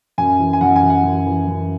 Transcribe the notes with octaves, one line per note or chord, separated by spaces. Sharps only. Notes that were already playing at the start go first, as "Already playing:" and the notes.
F#2 G#5
E3
G#5
F#2 F#5
G#5
E3
F#5
F#2
E3
F#2